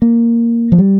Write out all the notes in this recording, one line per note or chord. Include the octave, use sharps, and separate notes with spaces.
A#3
F3
G3